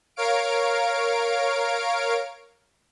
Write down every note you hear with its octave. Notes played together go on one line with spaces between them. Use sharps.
A#4 C#5 F5 D7